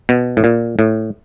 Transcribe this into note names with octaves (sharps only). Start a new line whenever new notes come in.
B2
A2
A#2
A2